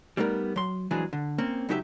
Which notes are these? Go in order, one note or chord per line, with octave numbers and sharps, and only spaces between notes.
G3 A3 B3 D#4 A#4
F#3 C6
F2 E3 F#3 G#3 D4 G#4
D3
A#3 C4 C#4
C#2 F#3 D#4 G4 A4 E5